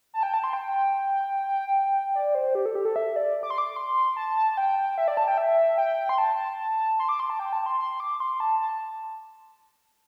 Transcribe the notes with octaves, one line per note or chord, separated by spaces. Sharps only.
A5
G5
A5
C6
G5
D5
C5
G4
A4
G4
A4
E5
D5
D6
C6
D6
C6
A5
A5
G5
E5
D5
A5
G5
E5
G5
C6
A5
C6
D6
C6
A5
G5
A5
C6
C6
D6
C6
A5
A5